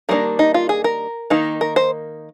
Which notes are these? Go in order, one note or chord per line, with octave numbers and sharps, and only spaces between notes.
D#3 G3 A#3 D4 A#4
D#4
F4
G#4
A#4
D#3 A#3 D#4
A#4
C5